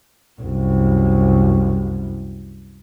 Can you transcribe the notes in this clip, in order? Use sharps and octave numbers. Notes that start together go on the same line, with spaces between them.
C2 F#2